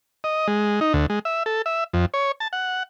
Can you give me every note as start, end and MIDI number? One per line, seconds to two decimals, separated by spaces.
0.24 0.48 75
0.48 0.80 56
0.81 0.93 63
0.93 1.06 38
1.10 1.19 56
1.25 1.43 76
1.46 1.62 69
1.66 1.84 76
1.94 2.06 41
2.14 2.32 73
2.40 2.48 81
2.53 2.83 78